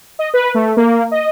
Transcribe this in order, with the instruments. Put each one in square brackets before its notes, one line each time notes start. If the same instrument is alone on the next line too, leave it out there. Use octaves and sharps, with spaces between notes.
[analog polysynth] D#5
B4
A3
A#3
D#5